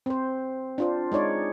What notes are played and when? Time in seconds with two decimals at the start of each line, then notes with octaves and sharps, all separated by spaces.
0.06 C4 C5
0.78 D4 F4 C5
1.12 G#3 D#4 C#5 D5